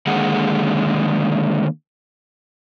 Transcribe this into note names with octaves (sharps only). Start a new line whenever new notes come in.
D3 D#3 G#3 A#3 F#5